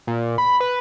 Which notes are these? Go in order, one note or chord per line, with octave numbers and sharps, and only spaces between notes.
A#2
B5
B4